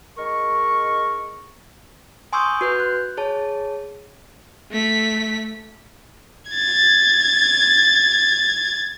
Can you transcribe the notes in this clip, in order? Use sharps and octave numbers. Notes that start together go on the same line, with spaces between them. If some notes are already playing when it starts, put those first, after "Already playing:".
G#3 D#4 A#4 C#6
G#5 C6 C#6 D#6 E6 G6
F#4 B4 G6
F#6
G#4 C#5 A5
A3 B6
G#6 A6